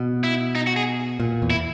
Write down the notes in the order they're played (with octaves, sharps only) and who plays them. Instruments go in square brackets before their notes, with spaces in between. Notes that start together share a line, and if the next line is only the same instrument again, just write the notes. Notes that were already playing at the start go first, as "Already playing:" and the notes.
Already playing: [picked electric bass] B2
[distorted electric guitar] E4
D#4
F#4
G#4
[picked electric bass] A#2
E2
[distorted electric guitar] E4